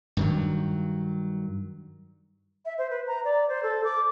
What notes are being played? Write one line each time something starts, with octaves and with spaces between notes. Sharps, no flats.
G2 D#3 F#3
E5
C5
B4
A#5
D5
C5
A4
D6